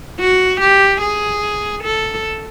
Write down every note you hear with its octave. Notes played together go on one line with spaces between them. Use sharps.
F#4
G4
G#4
A4